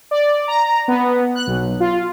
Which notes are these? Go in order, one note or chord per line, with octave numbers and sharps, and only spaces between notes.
D5
A#5
B3
F#6
B1
F4